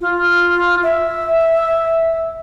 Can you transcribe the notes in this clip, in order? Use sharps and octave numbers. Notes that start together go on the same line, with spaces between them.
F4
E5